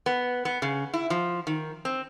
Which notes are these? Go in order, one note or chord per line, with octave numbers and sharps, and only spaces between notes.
B3
B3
C#3
E4
F3
D#3
C4